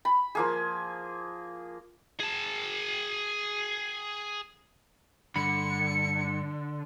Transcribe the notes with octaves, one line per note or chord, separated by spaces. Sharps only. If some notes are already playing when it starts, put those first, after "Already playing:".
B5
F3 A#3 G#4
G#4 A5
G2 D3 B5 C#7